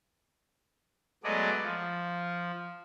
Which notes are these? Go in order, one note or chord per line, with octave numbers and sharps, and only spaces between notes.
F#3 G#3 A3 B3 D5 D#5
F3